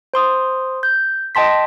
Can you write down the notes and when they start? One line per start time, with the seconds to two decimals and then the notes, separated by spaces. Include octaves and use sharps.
0.14 C5 C6 D#6
0.83 G6
1.35 D#5 G5 A5 C6 B6